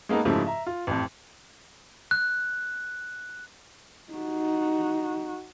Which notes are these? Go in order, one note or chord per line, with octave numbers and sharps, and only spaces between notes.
G#3 A#3 B3 D#4 A4
G#2 C#3 F3 A3 E4 G4
E5 A#5
F4
A1 F2
F#6
D#4 F#4